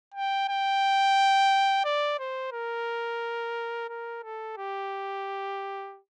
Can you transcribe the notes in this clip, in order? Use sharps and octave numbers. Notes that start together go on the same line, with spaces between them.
G5
G5
D5
C5
A#4
A#4
A4
G4